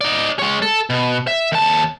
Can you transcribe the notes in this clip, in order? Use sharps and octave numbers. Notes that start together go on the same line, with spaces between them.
D#4 D5
G#3 C#5
A4
B2
E5
D#2 A5